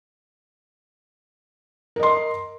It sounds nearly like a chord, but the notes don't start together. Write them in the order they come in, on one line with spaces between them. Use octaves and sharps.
A#4 D#5 C6